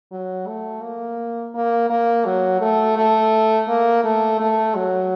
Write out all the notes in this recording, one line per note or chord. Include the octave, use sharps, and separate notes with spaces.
F#3
A3
A#3
A#3
A#3
F#3
A3
A3
A#3
A3
A3
F#3